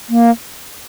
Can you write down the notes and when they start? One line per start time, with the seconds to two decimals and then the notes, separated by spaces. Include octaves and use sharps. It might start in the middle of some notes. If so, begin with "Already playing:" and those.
0.09 A#3